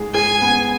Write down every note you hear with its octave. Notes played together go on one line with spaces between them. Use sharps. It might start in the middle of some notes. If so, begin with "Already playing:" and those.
Already playing: G#2 G#4
G#4 G#5
B3